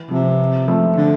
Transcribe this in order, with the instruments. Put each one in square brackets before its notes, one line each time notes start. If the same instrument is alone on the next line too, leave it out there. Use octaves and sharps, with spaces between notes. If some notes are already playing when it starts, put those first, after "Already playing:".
Already playing: [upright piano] E3
[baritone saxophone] C3 [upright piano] F3
[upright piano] F3 A3
[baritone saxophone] D3